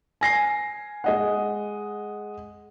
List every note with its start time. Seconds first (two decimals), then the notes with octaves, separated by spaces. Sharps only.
0.21 G#5 A#6 C7
1.04 G#3 D#5 F#5